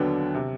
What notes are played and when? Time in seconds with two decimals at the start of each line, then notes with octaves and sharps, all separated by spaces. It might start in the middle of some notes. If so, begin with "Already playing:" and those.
Already playing: D#2 D3 F#3 B3 D4 G5
0.34 C3